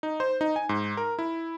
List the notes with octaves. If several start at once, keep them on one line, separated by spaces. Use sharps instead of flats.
D#4
C5
D#4
G#5
G#2
A#4
E4